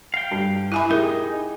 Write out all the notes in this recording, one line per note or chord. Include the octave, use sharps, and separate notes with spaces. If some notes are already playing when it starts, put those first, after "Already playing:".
F5 G5
G2
E4 E5 G#5 B5 D#6 F#6
D#4 G4 G#4 A#4